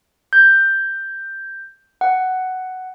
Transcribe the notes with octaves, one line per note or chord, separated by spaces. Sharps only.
G6
F#5